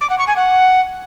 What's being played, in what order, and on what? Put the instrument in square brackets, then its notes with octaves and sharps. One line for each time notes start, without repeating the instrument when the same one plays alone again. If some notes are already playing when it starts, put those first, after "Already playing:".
[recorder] D6
F#5
C#6
G#5
F#5